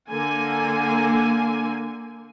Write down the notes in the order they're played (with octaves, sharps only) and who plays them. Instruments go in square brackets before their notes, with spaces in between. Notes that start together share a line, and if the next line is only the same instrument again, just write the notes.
[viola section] D3 A#3 G#5